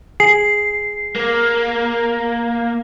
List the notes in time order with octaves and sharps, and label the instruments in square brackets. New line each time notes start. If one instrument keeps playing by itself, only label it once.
[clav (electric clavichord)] G#4 [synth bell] C7
[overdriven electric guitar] A#3